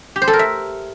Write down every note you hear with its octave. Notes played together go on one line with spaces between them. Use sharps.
G4
C5
A4
A#4
E5